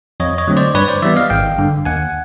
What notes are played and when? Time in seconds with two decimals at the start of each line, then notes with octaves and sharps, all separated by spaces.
0.20 F2 C#5 D#5
0.38 C#5 D#5
0.48 D3 F#3 A3 C4
0.57 C5 D5
0.74 G2 B4 C#5
0.88 C5 D5
1.02 E3 G3 B3 D5 E5
1.16 D#5 F5
1.30 G#1 F5 G5
1.58 G2 D3
1.85 D#2 F#5 G#5